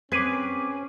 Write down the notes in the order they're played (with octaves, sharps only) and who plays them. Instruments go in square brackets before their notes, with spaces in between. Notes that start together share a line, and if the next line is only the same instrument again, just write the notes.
[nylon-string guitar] C4 [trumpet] C#4 [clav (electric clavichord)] G#4 B4 [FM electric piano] D6 G#6